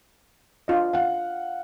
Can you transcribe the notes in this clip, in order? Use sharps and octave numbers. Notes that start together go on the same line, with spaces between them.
D4 F4 D#5
F5 F#5